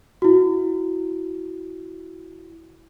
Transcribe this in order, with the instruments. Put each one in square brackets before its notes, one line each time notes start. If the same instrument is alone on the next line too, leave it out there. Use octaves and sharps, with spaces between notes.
[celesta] E4 F#4